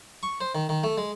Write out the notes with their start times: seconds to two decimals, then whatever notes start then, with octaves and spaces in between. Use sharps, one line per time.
0.23 C#6
0.41 C5
0.55 D#3
0.69 D#3
0.84 A3
0.98 G#3